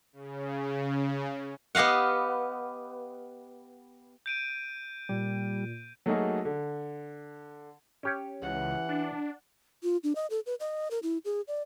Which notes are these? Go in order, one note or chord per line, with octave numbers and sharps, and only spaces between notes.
C#3
B3 G4 D#5 F5 F#5
G6 D7 D#7
A#2 G3
F#3 A3 A#3 D#4 F#4 G#4
D3
C#4 G4 C#5
C#2 E3 F#5
D4
F4
D4
D#5
A4
B4
D#5
A#4
E4
G#4
D5